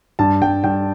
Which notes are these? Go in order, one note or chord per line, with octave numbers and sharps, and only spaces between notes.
G2 A5
G2 G5
G2 G5